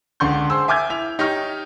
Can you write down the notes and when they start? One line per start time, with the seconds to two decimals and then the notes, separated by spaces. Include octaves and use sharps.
0.20 C#2 D3 D4 C6 C#6 G6
0.50 G#4 C5 E6
0.68 E5 G#5 D6 F6 G6 G#6
0.89 E4 E5 F7
1.19 D#4 G4 C#5 C#6 F6